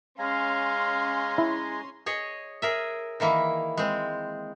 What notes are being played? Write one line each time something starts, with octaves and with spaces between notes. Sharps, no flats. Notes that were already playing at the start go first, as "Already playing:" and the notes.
G#3 C#4 F5 G#5 A#5 C6
E4
G#4 C#5 D#5
G#4 A#4 E5
D#3 E3 A#3 E4
G#3 C4